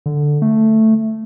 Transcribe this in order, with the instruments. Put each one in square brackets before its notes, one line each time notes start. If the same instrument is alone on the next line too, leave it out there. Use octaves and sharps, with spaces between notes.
[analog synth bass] D3
A3